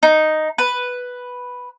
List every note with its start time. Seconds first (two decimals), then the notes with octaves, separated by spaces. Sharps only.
0.03 D#4
0.58 B4